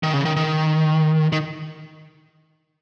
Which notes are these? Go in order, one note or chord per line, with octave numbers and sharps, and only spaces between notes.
D#3
C#3
D#3
D#3
D#3